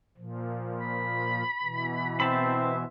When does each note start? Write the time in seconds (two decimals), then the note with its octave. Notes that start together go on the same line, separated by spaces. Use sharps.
0.18 A#2 F3
0.80 B5
1.63 B2 E3
2.20 C4 C5 E5 A5 B5